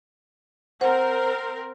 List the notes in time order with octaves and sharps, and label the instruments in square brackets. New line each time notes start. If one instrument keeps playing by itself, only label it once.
[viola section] C4 A#4 [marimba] C5 F#5